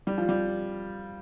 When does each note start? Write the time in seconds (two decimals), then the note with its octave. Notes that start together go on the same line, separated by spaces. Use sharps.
0.07 G3
0.18 F3
0.29 G3